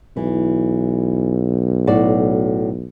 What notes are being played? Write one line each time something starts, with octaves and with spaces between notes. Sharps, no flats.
B1 E3
A2 F#4 D5